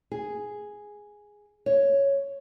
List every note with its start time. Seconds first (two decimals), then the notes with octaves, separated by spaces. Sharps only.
0.12 G#4
1.66 C#5